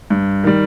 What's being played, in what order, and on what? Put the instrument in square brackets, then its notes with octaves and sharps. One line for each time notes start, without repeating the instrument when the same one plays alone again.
[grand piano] G2
D#3 G3